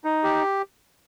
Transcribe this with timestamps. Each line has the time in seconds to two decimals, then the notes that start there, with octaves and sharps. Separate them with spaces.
0.04 D#4
0.24 G4